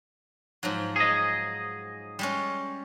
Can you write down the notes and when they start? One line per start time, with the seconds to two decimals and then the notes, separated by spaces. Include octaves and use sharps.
0.63 G#2 F3 F#3
0.96 G#4 D#5
2.19 G3 G#3 C#4